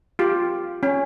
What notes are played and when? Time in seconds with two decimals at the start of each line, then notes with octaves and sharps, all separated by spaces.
0.19 F4 G4
0.83 C#4